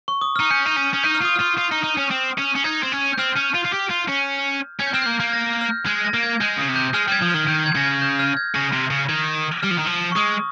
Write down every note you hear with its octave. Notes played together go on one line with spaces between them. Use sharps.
C#6
D#6
D#4 F6
C#4 G6
D#4
C#4
C#4
D#4 G6
F6
F4 D#6
F4 F6
F4
D#4
D#4
C#4
C4
C#4
C#4
D#4 G#6
C4
C#4
G6
C4 F6
C#4
F4
F4
G4
F4
C#4
C#4 G#6
G6
C4 F6
A#3 G6
A#3
A#6
F6
G6
G#3 G#6
A#6
A#3
G#6
G#3 G6
C#3 D#6
C3
G6
G#3 F6
G3 G#6
F3
D#3 F6
D#3 G6
G#6
C#3 A#6
G#6
G6
F6
G#6
C#3 A#6
C3
C#3
D#3 G#6
G3 F6
F3
D#3
F3
C#6
G#3 D#6